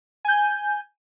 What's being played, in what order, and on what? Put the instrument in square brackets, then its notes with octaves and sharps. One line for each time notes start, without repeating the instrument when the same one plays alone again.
[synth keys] G#5 G6